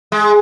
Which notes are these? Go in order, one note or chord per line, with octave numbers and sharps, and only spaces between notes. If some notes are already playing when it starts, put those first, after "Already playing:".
G#3